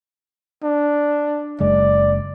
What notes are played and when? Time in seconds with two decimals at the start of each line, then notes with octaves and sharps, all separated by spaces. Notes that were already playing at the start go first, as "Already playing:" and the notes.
0.63 D4
1.60 F#1 G#3 D5